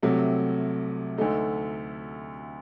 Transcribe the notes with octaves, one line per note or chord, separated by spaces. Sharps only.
C2 C3 F#3 A3
D2 D3 A3 D#4